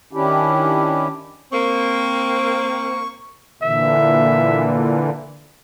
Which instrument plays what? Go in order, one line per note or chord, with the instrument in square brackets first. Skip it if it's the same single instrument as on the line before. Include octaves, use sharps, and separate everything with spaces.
[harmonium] D#3 C#4 D4 E4 G4
[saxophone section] A#3 C4 [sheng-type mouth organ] C#6
[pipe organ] A#2 D3 E3 [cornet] E5